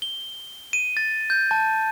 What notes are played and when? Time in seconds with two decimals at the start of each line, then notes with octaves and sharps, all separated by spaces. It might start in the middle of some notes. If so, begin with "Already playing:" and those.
0.02 G7
0.73 D#7
0.97 A6
1.30 G6
1.51 A5